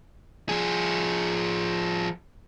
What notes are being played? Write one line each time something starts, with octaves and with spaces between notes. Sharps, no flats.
F3 G#4